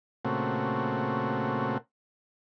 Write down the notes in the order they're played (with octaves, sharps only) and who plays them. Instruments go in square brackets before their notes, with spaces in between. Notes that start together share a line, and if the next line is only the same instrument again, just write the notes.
[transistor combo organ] A#2 C#3 A3 C4 F#4